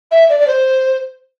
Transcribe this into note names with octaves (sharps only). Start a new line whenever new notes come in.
E5
D5
D5
C5